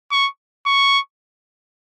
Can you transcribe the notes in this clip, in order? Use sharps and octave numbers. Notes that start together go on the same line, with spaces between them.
C#6
C#6